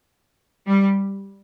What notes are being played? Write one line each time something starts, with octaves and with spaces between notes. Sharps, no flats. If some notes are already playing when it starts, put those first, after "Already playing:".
G3